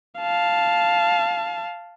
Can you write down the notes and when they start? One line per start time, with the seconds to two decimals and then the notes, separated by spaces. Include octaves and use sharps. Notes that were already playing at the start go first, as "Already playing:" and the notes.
0.19 F5 A5